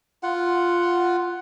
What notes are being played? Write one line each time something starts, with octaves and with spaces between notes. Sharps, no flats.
F4 F#5